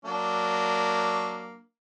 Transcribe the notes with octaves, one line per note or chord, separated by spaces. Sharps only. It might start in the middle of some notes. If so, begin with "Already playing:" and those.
F#3 A#3 D4